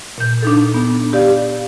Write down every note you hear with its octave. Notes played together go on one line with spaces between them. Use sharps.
A#2 G6
D4 D#4 A4
B3 D4
G4 D5 F5